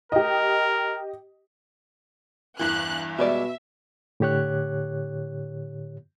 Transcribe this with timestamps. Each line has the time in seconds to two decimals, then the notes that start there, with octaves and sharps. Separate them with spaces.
0.12 G4 A#4 D#5
2.59 E2 G2 E3 F#6
3.18 B2 G3 G#3 D5 E5
4.20 A2 D3 G4 C#5 F#6